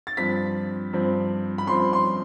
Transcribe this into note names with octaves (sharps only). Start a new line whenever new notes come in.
A6
G2 F3 C4 B6
G2 F3 C4
B5
G2 F3 C4 C6
C6